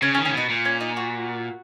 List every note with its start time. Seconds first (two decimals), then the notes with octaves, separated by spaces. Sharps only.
0.02 C#3 C#4
0.14 C#4
0.17 D#3
0.25 C#3 C#4
0.34 B2 D#4
0.49 A#2
0.65 C#4
0.80 D#4
0.97 F#4